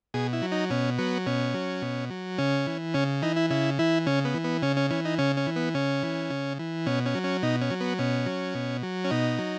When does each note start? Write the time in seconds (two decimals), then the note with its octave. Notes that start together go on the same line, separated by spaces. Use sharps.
0.14 B2 G#4
0.33 E4
0.42 F#3
0.52 D#4
0.70 B2 C#4
0.98 F#3 B3
1.26 B2 C#4
1.54 F#3
1.82 B2
2.10 F#3
2.38 C#3 C#4
2.67 E3
2.94 C#3 C#4
3.22 E3 D#4
3.36 E4
3.50 C#3 E4
3.79 E3 E4
4.06 C#3 C#4
4.25 B3
4.34 E3
4.44 B3
4.63 C#3 C#4
4.77 C#4
4.91 E3 C#4
5.05 D#4
5.18 C#3 C#4
5.37 C#4
5.47 E3
5.56 B3
5.75 C#3 C#4
6.03 E3
6.30 C#3
6.59 E3
6.86 B2 C#4
7.06 C#4
7.15 F#3
7.24 C#4
7.43 B2 D#4
7.61 C#4
7.71 F#3
7.81 B3
7.99 B2 C#4
8.26 F#3
8.55 B2
8.83 F#3
9.04 C#4
9.11 B2 D#4
9.38 F#3